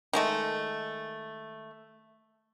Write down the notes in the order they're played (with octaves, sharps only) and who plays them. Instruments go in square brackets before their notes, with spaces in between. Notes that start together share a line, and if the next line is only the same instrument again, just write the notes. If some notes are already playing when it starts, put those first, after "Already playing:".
[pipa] D#3 G#3 A3